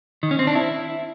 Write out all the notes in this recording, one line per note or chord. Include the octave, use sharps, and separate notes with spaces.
D#3
C#4
C4
D4
E4